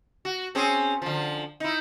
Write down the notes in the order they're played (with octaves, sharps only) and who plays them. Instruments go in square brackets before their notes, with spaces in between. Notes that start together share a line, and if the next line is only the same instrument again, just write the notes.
[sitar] F#4
C4 C#4 G#4
D3 F3
D#4 E4